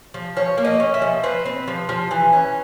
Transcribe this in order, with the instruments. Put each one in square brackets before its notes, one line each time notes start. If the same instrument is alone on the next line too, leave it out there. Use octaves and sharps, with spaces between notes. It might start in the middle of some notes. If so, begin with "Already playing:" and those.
[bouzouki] F3
F3 C#5
A#3
D#5
C#4
E5
F3
C4 B4
C4
F3
F3
E3
C#4